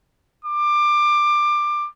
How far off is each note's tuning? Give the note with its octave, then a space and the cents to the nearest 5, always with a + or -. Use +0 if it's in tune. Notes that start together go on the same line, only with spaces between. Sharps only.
D6 +20